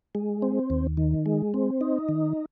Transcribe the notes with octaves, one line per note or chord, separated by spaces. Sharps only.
G#3
C4
D#2
D#3
G#3
C4
D#4
D#3